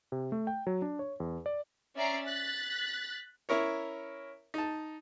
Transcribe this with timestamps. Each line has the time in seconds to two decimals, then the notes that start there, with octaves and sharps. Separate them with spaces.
0.12 C3
0.32 A3
0.47 G5
0.67 F#3
0.82 D4
0.99 C#5
1.20 E2
1.46 D5
1.96 C#4 D5 E5 A#5 C7 D7
2.26 F#6 A6 B6
3.49 C#4 E4 A#4 C#5
4.54 D#4 A5